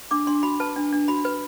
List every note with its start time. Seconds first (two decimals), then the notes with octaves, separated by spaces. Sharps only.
0.11 D4 D6
0.27 D4 C6
0.43 F#4 B5
0.60 B4 A5
0.76 D4
0.92 D4
1.08 F#4 B5
1.25 B4